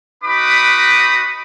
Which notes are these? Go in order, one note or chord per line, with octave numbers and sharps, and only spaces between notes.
D#4 F#4 B4 B5 D6 D#6